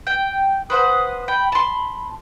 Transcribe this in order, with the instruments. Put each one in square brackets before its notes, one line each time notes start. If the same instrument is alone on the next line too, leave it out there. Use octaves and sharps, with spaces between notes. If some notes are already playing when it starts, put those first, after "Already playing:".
[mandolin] G5
[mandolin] B4 C5 F#5 [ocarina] D#6
[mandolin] G5 [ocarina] B5
[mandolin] A5 C6